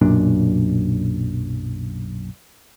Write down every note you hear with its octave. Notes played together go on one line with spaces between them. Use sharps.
B1 F#2 A#2 D4